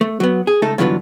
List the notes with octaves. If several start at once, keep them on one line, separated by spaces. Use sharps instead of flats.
A3
F#3 B3
G#4
C#2 A3 D#4 A4
G2 D3 E3 F#3 B3 F4